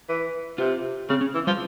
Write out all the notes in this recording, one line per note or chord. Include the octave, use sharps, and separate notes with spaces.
E3
C3 F4
C#3 C4
C#4
E3
F3 G3